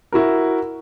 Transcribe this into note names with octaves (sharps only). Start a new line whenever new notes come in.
E4 F#4 A#4